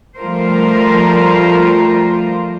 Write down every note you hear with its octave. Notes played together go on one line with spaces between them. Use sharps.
F3 G3 A3 F4 A#4 C5